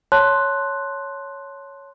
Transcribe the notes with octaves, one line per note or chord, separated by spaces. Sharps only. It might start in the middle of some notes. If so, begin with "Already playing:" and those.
C#5 A5 C6 F#6